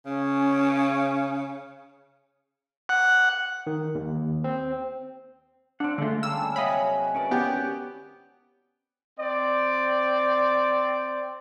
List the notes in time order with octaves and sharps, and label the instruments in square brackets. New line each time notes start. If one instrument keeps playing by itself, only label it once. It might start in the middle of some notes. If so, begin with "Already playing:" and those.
[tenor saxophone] C#3 [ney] C#4
[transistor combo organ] F#5
[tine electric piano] D#3
D#2
C4
[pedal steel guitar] C4 F#5 [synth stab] D4 [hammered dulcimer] A4 A#4 F5
[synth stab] D3 A3 [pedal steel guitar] G#3 F4 [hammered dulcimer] G#5
[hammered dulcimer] C#3 G3 A#3 [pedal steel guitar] A5 F6 [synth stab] E6
[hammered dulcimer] C3 G#3 [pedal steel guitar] F#3 C#5 [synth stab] D#5 F5 B5
[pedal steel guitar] C#4 A#4 D5 [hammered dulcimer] F#4 B4 A5
[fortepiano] B3 G4
[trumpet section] C4 D5